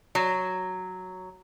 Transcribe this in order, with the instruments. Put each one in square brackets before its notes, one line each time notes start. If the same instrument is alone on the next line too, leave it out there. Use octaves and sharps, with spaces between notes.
[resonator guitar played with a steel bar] F#3